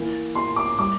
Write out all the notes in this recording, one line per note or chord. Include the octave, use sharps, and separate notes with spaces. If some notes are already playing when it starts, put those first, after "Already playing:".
Already playing: E3 A#3
A#3 C6
D6
G3 D6